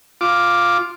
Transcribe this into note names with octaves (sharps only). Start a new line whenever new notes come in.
F4 D6